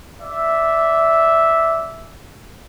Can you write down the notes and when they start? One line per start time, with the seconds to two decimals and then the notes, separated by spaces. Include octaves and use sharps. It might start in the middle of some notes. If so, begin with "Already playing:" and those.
0.22 D5 E5